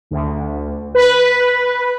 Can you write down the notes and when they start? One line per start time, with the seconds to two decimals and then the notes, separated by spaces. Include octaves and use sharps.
0.11 D2
0.95 B4